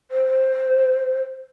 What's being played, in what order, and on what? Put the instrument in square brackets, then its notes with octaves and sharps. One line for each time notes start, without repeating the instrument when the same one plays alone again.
[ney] C5